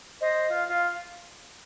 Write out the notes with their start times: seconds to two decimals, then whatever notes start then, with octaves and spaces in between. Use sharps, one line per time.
0.19 C5 D#5
0.48 F4
0.68 F4